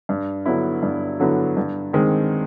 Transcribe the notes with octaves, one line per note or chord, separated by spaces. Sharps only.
G2
D3 F#3 B3 E4
G2
D3 F#3 B3 E4
G2
D#3 G#3 C4